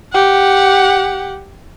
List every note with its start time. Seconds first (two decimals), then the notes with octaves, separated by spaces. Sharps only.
0.12 G4 F#5